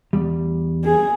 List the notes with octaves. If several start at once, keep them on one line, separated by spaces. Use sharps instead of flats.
E2 G3
G#4